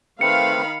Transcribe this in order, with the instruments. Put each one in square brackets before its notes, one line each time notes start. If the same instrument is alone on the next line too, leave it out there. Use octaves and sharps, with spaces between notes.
[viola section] D#3 F5 B5 [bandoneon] A3 C4 B4 [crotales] C#7